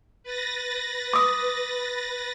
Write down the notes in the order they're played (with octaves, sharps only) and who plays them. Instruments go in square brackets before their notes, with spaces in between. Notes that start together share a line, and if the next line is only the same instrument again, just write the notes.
[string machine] B4 A6 A#6
[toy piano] D6 D#6